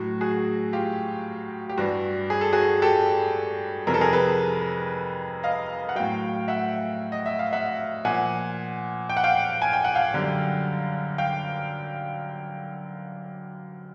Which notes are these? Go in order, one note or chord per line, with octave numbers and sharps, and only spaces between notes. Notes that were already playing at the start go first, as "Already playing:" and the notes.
Already playing: A2 F#3 F#4
F#4 G#4
F4 G4
G4
G2 E3 G3 F#4
G#4
A4
F#4 G#4
G4 A4
F2 C3 E3 A#4
A4
G#4 A#4
A4 B4
D#5 F5
F#5
A2 F#3 F5 G5
E5 F#5
D#5
E5
F5
E5 F#5
A#2 F3 F#5 G#5
G5
F#5
F5 G5
G#5
G5
F#5
F5 G5
F#2 D3 G3
F5 G5